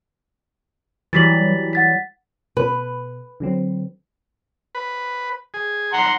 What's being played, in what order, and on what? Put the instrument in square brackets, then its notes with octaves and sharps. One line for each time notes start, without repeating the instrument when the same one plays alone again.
[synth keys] E3 F#3 G3 [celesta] A6 B6 F#7
[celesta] F#5 A6 B6
[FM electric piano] B2 [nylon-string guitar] B4
[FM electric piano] D3 F#3 C4
[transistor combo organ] B4
G#4
[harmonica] F#5 A#5 C6